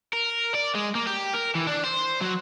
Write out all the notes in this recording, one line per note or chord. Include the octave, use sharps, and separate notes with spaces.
A#4
D5
G#3
A#3
G4
A#4
E3
D4
C5
F#3